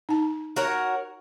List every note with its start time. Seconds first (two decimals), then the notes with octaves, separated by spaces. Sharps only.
0.09 D#4 A5
0.56 F#4 A#4 C#5